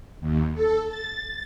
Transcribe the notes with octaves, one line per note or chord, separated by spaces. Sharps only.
D#2
A4
A6